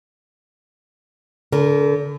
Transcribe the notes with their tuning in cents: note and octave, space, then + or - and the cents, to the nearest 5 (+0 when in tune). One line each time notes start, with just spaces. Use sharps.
D3 -35 A#4 +0